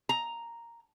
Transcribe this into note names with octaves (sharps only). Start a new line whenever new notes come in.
A#5